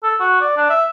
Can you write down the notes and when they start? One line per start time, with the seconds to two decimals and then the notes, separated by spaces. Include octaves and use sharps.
0.03 A4
0.20 F#4
0.41 D5
0.57 D4
0.70 E5